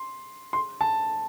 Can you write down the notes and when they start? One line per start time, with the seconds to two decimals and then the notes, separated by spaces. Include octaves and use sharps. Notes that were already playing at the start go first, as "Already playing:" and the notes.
Already playing: C6
0.53 C6
0.81 A5